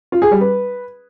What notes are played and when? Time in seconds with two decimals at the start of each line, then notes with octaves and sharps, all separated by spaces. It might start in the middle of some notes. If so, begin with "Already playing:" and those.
0.12 F4
0.22 G#4
0.31 G3
0.41 B4